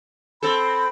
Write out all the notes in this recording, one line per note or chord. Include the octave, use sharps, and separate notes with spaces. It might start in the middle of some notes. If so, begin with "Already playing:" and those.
C4 A4 B5